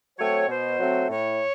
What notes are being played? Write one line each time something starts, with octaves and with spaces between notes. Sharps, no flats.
F#3 A3 C4 C#5
B2 C5
F#3 A3 C4
A2 C#5